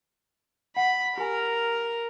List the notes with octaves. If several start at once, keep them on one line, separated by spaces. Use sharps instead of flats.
F#5 B5
G4 A#4 G#5